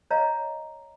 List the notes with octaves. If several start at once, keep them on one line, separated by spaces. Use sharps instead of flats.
C#5 D#5 F5 A#5